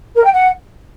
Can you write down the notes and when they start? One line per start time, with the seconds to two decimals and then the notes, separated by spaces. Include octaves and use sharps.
0.15 A#4
0.23 G5
0.32 F#5